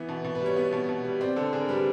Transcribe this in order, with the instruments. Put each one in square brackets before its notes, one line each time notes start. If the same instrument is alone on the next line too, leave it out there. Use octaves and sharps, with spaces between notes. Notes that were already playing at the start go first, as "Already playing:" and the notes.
Already playing: [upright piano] E3 B3
B2
B2
B4
G3
C#5
B3
B2
B2
G3
C4 D5
D3 A4
D3 G#4
A#4
G3 B4
A#4